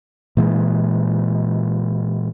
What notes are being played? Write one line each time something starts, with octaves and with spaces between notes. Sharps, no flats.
A#2 E3 G#3